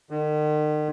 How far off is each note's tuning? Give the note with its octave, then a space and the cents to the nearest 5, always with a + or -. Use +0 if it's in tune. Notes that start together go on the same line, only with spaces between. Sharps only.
D#3 -45